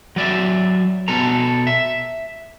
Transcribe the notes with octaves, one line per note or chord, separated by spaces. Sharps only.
F#3 D5 E5
B2 A4 A#5
E5